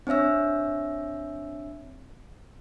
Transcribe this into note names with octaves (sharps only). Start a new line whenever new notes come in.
C4 D4 C#5 E5 E6